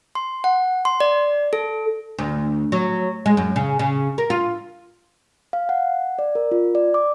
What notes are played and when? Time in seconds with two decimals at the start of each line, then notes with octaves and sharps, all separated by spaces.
0.15 C6
0.44 F#5
0.85 C6
1.00 D5
1.53 A4
2.18 D2
2.72 F#3
3.26 G#3
3.37 F#2
3.56 C#3
3.79 C#3
4.18 A#4
4.30 F4
5.53 F5
5.69 F#5
6.19 D5
6.35 A#4
6.52 F4
6.75 D5
6.94 D6